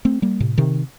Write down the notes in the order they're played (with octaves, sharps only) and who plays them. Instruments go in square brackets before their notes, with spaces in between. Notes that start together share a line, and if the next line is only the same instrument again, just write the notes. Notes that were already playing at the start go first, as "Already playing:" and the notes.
[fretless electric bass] A3 C4
G3 A#3
A2 C3
C3 D#3